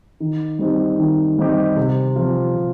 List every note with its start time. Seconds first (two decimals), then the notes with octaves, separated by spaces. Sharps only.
0.20 D#3
0.59 G3 C4 D#4 G4
0.99 D#3
1.38 G3 C4 D#4 G4
1.77 C3
2.16 F3 C4 F4
2.56 C3